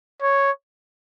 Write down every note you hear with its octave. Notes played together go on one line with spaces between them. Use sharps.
C#5